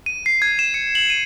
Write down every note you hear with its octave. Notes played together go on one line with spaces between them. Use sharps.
D#7
C7
G#6
E7
C#7
F#7
D#7